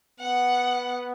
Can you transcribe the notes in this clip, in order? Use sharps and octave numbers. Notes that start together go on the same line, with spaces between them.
B3 F#5